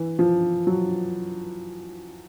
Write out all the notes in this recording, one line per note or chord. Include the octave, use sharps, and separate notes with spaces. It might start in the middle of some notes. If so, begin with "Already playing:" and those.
Already playing: E3
F3
F#3